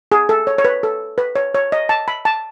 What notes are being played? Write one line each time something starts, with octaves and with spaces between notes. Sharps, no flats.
G#4
A4
C#5
C#5
B4
A4
B4
C#5
C#5
D#5
A5
B5
A5